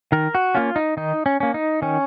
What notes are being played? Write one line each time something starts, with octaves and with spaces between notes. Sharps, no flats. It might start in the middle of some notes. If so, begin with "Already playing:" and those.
D#3 A#4
F#4
A#3 C#4 F4
D#4
D#3 D#4
C#4
A#3 C#4
D#4
D#3 C#4